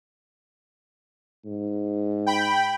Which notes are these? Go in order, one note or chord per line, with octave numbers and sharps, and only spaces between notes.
G#2
G5 B5